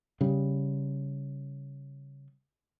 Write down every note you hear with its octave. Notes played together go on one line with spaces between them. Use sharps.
C#3 G3